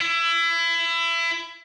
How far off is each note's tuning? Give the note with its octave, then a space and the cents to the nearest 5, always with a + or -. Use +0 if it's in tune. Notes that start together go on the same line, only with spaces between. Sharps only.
E4 +25